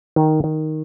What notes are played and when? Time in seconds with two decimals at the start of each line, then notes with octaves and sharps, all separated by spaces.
0.16 D#3
0.44 D#3